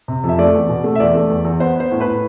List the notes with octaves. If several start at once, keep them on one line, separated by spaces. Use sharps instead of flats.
C3
F2
E5
A3 D5
E2
B2
A3
E5
E2 D5
A3
E2
E2
B3 C5
B3 C5
A2
B4
A2